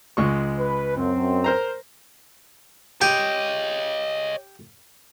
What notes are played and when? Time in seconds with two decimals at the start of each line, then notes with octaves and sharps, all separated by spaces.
0.17 C#2 G#3 C#6
0.59 B4
0.97 F#2 C4
1.44 A#4 C5 A#5
3.02 G4 C#5 D#5